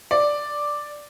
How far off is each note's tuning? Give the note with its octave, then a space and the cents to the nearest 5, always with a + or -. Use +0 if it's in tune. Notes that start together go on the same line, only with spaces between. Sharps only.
D5 +0